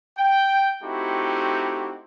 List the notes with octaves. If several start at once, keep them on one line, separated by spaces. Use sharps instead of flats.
G5
A3 C4 D#4 E4 F#4 G4